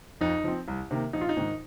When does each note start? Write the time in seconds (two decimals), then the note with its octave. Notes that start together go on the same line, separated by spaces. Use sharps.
0.21 F2 D#4
0.44 F3 C4
0.68 C2
0.91 C3 D#3 A#3
1.13 A#1 D#4
1.21 F4
1.29 D#4
1.37 G#2 D#3